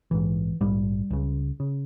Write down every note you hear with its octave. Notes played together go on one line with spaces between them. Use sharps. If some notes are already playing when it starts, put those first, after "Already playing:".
A#1 G#2 E3
A#1 G#2 G3
C#2 C#3
C#3